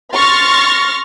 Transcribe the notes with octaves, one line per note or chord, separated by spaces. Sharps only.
C6 C#6 F6 A6 A#6